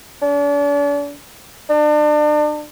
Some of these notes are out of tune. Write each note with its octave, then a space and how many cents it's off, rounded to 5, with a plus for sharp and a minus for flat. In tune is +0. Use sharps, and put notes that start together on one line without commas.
D4 -40
D4 +35